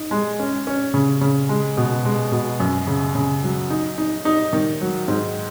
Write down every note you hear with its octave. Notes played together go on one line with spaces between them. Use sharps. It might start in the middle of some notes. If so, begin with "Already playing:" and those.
Already playing: D#4
G#3
C#4
C#4
C#3
C#3
G#3
B2
G#3
B2
F#2
C#3
C#3
F#3
D#4
D#4
D#4
D#3
F#3
G#2